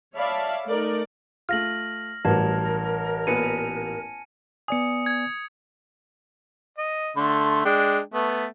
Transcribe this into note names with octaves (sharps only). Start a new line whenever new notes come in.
C#5 D5 E5 F5 A5 B5
A3 D#4 A#4 D5
A3 F4 F6 A#6 F#7
A1 G2 F#3 A#4 A5 G#6
A#2 B3 B4 G#5 C#7 D#7
B3 D5 G#5 D#6 C#7
G#6
D#5
D3 A3 C6
G#3 D4 G5
A3 B3